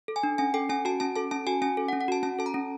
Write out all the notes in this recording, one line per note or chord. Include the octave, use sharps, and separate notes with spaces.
A4
G#5
D4
C#4 G#5
A4 G5
C#4 G#5
F#4 A5
C#4 A5
A4 A5
C#4 A5
F#4 G#5
C#4 G#5
A4
F#5
C#4
F#5
F#4 A5
C#4 A5
A4 A5
A#5
C#4